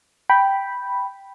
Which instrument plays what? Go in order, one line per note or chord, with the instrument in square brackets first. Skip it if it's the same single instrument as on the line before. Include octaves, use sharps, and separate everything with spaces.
[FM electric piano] G5 B5